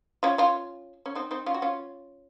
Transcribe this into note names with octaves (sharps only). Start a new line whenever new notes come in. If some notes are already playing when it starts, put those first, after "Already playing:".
C#4 F4
C#4 F4
C#4
C4 D#4
C4 D#4
C#4 F4
F#4
C#4 F4